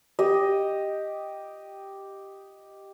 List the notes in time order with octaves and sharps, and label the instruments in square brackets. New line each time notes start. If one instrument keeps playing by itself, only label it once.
[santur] G4 D#5